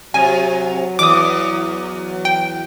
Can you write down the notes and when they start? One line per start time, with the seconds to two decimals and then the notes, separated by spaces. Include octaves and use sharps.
0.14 C3 F#3 G#5
0.99 E2 D6 D#6
2.25 G5